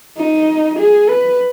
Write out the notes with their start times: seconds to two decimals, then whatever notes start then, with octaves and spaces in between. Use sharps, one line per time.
0.17 D#4
0.79 G#4
1.09 B4